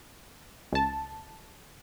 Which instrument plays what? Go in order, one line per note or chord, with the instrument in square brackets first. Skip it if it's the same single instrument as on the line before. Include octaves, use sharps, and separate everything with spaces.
[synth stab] C#2 A5